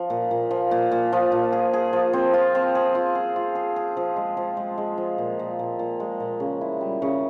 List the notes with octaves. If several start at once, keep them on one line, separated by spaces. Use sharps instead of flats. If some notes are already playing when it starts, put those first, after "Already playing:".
Already playing: F3
A#2
A#2
F3
A#2
A#2
F3
A#2
G#4
G#4
F3
C4
F4
C4
G#4
F4
G#4
F4
G#4
G#4
F3
G#3
F3
G#3
G#3
F3
A#2
A#2
A#2
A#2
G#3
A#2
C#3
E4
G3
C#3